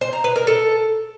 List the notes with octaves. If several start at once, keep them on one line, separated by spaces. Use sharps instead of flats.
C5
A#5
B4
A#4
A4